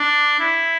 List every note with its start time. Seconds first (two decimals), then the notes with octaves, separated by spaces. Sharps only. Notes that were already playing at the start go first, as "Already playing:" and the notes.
Already playing: D4
0.40 E4